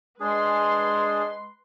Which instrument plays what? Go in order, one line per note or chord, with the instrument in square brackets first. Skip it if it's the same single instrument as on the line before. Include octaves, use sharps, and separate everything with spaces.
[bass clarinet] G#3 [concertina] D4 G#4 [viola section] B4 C6